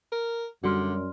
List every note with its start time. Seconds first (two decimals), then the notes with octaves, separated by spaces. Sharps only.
0.12 A#4
0.64 F#2 D3 G3 F#4 D5 C6 F6